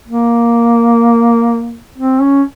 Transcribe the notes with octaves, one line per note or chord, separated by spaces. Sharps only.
A#3
C4
C#4